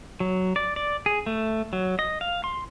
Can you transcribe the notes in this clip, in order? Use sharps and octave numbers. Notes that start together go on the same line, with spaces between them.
F#3
D5
D5
G#4
A3
F#3
D#5
F5
C6